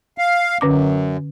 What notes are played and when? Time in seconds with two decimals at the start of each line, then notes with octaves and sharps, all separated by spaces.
0.18 F5
0.61 F#2 D3 C#4 D6